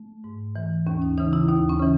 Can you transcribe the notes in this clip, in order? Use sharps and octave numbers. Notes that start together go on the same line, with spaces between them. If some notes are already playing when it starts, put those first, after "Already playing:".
Already playing: A3
G#2
E3
D#2 C#4
D#4
C#3 E3 D#4
E4
D#2 D#4
C#4
C#3 E3